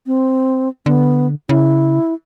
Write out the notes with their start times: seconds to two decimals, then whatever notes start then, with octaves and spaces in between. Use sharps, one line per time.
0.07 C4
0.86 D3 B3
1.49 C#3 E4